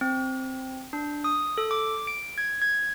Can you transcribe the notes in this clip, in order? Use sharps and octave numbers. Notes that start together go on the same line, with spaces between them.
C4
D4
D#6
A4
D6
D7
G#6
G#6